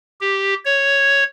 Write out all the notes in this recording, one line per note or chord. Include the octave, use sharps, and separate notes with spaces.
G4
C#5